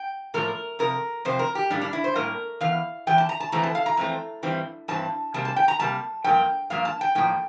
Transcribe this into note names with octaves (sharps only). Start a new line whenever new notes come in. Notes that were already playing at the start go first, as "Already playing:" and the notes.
Already playing: G5
A2 F3 A#3 A#4
F2 C3 A#4
F2 C3 C4 C5
A#4
G4
A2 G3 A#3 D4
D4
E4
C5
A2 G3 A#3 A#4
E2 E3 F5
E2 E3 G5
A5
A#5
A5
F2 E3 A3 C4 A#5
A5
F5
A#5
F2 E3 A3 C4
G2 E3 G3 C4
G2 E3 C4 A5
C3 G3 A#3 A5
A5
G5
A#5
C3 G3 A#3 A5
G2 F3 A#3 G5
G2 F3 A#3 F5
A5
G5
A2 F3 A#3 G5